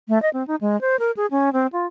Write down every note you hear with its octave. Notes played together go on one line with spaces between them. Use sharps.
A3
D#5
C4
D#4
G#3
C5
A#4
G#4
C#4
C4
F4